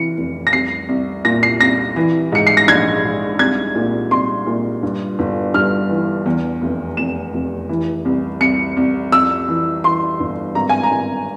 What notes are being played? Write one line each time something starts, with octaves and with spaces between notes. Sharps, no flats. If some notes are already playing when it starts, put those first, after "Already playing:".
Already playing: C3 E3 C#7
F1
A#6
C2 C7
C2
A#2 A#6
C7
C2 A#6
E3
G#2 C#7
C7
A#6
A#1 G#6
G#2
C2 G#6
A#2
C2 C6
A#2
G2
G1
G2 F6
E3
E2
F1
F1 E7
F1
E3
C2
C2 C#7
C2
F2 E6
E3
E3 C6
G1
G#1 A#5
G#5
A#5
G#1